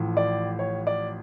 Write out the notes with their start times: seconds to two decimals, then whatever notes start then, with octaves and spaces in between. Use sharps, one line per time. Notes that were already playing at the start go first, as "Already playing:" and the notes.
Already playing: A1 A2 F3
0.17 D5
0.59 C#5
0.87 D5